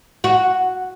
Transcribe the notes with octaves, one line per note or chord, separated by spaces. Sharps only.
F#4